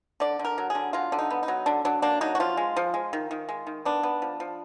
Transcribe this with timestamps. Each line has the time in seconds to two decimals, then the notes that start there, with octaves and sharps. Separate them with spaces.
0.20 D3 D5
0.39 D3
0.45 A#4
0.58 F#3
0.70 D3 G#4
0.93 F#3 F4
1.12 D3
1.19 D#4
1.30 B3
1.43 D#4
1.48 F#3
1.66 D3 D4
1.85 F#3 D4
2.02 A#3 D4
2.21 F#3 D#4
2.35 F#4
2.40 F3 F4
2.57 G#3
2.76 F3
2.94 G#3
3.13 D#3
3.31 D#3
3.49 G#3
3.67 D#3
3.85 B3 D4
4.03 B3
4.22 F3
4.40 F3